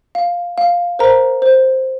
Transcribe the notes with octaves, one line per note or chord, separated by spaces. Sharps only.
F5
F5
A#4 C5 A#5
C5